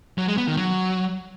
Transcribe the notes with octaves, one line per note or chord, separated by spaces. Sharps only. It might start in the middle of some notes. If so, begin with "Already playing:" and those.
F#3
G#3
B3
D#3
F#3